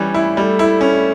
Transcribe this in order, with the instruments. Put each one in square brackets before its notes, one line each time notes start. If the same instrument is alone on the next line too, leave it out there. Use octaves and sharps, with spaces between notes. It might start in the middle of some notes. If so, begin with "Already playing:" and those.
Already playing: [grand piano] E3 G3 C#4
E4
[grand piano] G3 [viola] A3
[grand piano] E4
C#4